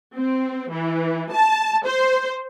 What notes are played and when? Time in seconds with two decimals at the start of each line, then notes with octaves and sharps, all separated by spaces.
0.15 C4
0.71 E3
1.32 A5
1.85 C5